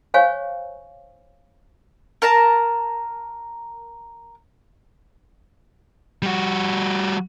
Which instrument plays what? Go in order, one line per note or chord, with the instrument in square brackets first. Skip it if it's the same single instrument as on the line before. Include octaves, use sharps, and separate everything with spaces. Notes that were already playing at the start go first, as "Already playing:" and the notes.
[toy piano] C5 C#5 F5 G#5 C#6
[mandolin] A#4 A5 A#5
[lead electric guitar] G3 F#4